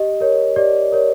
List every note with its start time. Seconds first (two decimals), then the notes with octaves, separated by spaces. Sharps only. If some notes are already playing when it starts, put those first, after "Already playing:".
Already playing: G4 D#5
0.20 A#4 C#5
0.56 G4 D5
0.92 A#4 C#5